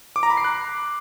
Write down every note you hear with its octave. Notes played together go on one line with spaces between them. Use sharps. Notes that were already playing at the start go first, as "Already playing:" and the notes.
D6
A#5
B5
C7
F#6